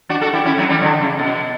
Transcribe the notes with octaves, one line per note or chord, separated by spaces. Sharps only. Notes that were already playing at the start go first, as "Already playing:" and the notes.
D4 F#4
F#4 A4
E4 G4
C#4 E4
F#3 A3
E3 G3
D3 F#3
C#3
B2